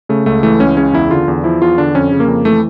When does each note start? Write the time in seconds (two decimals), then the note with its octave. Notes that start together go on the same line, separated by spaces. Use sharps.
0.09 C#3 A3
0.26 C#2 A3
0.43 E3 A3
0.60 C#2 C#4
0.77 C#3 C#4
0.93 E2 E4
1.11 D3 F4
1.28 E2
1.44 F3 E4
1.61 E2 F4
1.78 D3 D4
1.95 F2 C#4
2.12 C#3
2.20 A#3
2.28 F2
2.45 E3 A3